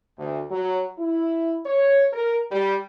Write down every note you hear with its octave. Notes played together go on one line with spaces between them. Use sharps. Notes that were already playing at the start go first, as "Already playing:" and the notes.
D2
F#3
E4
C#5
A#4
G3